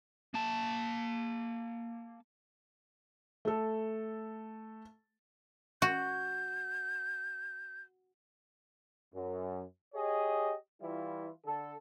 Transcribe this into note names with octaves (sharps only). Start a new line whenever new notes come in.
A#3 A5
A3 A4
F#4 G6
F#2
G4 G#4 C#5 D#5
E3 G3 E4 F4
D3 A4